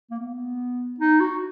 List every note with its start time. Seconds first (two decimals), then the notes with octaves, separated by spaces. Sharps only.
0.11 A#3
0.19 B3
1.00 D#4
1.20 F#4